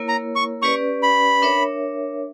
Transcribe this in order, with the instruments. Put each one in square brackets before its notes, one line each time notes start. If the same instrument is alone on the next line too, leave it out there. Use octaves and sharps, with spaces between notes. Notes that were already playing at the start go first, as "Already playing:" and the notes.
Already playing: [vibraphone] A#3 E4 A#4 C#5
[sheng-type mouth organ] A#5
C#6
[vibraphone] C#4 G4 B4 D5 [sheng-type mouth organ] C#6
[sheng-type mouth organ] B5
[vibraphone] D4 A#4 C#5 E5